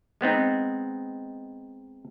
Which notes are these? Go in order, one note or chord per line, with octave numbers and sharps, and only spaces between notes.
G#3 B3 C4 D#4